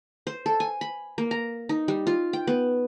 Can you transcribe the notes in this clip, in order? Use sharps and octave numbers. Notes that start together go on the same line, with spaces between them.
C5
A4
G#5
B5
A#3
A#5
D#4
G3
F4
G5
B3